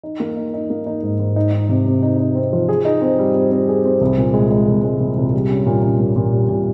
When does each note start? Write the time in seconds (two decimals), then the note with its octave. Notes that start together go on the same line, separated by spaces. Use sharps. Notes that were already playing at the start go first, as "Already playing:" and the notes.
0.03 D#4
0.20 A#3
0.37 D#4
0.54 D#4
0.70 A#3
0.86 D#4
1.03 G#2
1.19 G#2
1.36 D#4
1.52 D#4
1.69 C3
1.86 C3
2.03 D#4
2.19 D#4
2.35 C4
2.53 F3
2.69 G#4
2.85 D#4
3.01 C4
3.19 G3
3.35 C4
3.51 C4
3.69 G#4
3.85 C4
4.01 C2
4.18 A#2
4.34 G#3
4.51 G#3
4.68 C2
4.83 G#3
5.00 A#2
5.18 C2
5.33 G3
5.50 C#4
5.66 A#2
5.83 C#4
6.00 A#2
6.16 A#2
6.33 G3
6.49 A#2